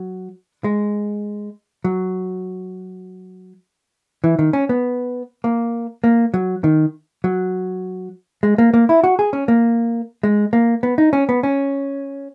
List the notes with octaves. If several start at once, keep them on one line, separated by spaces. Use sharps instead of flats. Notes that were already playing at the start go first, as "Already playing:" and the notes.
Already playing: F#3
G#3
F#3
E3
D#3
C#4
B3
A#3
A#3
F#3
D#3
F#3
G#3
A#3
A#3
E4
F#4
G#4
C#4
A#3
G#3
A#3
B3
D#4
C#4
B3
C#4